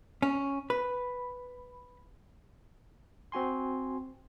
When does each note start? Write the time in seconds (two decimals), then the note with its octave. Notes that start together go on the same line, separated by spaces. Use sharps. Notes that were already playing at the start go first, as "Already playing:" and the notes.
0.22 C#4
0.70 B4
3.32 C4 F#4 G#5 C6